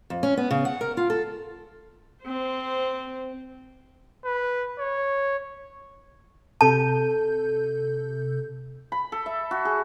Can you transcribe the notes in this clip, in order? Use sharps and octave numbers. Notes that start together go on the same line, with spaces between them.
F2
C#4
B3
C#3
F#5
A#4
F4
A4
C4 C5
B4
C#5
C3 A4 A5 G6
B5
A4
E5
F#4
G#4